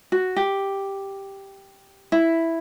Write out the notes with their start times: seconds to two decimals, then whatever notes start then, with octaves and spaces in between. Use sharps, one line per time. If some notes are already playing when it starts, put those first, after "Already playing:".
0.12 F#4
0.37 G4
2.12 E4